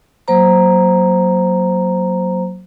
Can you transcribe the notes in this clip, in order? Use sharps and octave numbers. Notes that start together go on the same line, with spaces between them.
F#3 A#3 C5 A#5